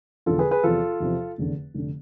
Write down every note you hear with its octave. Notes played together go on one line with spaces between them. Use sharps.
E1 E2 D3 F3 F4 A4
G#4 B4
G#4 B4
E2 C3 F3 F4 A4
E2 C3 F3
F1 E2 D3
F1 D3